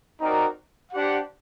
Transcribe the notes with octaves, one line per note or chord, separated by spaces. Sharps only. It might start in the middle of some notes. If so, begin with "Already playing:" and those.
C4 D#4 F#4 A#4 D5
D4 G4 C5 F#5